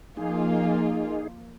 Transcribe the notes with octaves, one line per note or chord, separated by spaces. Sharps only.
F3 A#3 D#4 F4 G#4